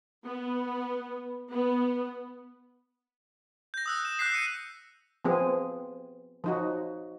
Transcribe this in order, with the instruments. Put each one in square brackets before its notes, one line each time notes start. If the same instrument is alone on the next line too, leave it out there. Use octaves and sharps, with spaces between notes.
[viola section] B3
B3
[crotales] G6 A#6
D#6 E6 F#6
E7
D#6 F#6 G6 B6 C7
C#7 D#7
[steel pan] F3 B3 C4 G#4
F3 D#4 F#4